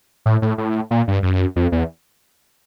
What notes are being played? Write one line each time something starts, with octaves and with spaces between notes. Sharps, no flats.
A2
A2
A2
A#2
G2
F#2
F2
E2